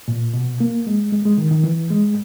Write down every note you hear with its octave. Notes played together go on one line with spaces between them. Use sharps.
A#2
B2
A#3
G#3
G#3
G#3
D#3
D#3
E3
G#3